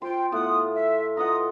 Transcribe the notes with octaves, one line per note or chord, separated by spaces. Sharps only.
F4 C5 G5 C6
A2 B3 F4 F#5 D#6
E5
F4 B4 D#5 F#5 A#5 D#6